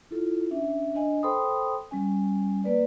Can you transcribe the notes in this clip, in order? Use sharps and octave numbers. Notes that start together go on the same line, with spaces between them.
E4 F4 A4
C#4 D4 E5
D4 D#5 G#5
A4 C5 G5 B5 C6 D#6
G3 C#4 G#5
A#3 B4 D5